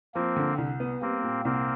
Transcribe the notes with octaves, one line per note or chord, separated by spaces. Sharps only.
F3 A#3 C4
D3
C2
B3
G3 A#3 C4
A#2
C2 A#3 C4